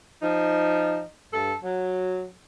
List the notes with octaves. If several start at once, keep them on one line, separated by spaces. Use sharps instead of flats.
F3 D#4
G2 A4
F#3